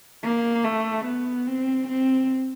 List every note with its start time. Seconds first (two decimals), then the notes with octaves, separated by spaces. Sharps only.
0.23 A#3
0.64 A3
1.05 B3
1.47 C4
1.88 C4